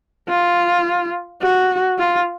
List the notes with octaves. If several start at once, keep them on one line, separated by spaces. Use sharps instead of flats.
F4
F#4
F4